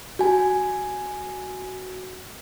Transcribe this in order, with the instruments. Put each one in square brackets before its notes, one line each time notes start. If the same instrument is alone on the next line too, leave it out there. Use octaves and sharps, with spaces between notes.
[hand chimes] F#4 G#5